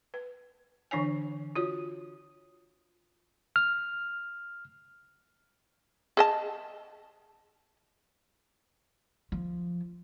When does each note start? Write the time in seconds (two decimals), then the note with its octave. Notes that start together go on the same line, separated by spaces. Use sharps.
0.14 B4
0.91 D3 E3 D4 C#5 G#5
1.56 F4 F#4 C#5
3.56 F6
6.17 G#4 D#5 A5
9.32 F3